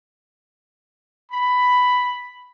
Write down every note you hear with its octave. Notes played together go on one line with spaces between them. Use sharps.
B5